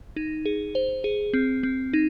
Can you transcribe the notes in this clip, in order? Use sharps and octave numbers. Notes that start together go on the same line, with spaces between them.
D#4
G#4
C5
G#4
C4
C4
D#4